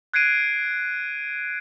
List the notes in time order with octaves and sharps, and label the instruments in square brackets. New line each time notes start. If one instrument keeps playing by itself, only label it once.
[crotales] F#6 G#6 C7 D7 D#7